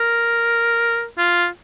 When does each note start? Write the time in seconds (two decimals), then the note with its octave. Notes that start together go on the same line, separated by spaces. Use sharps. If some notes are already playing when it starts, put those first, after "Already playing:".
Already playing: A#4
1.18 F4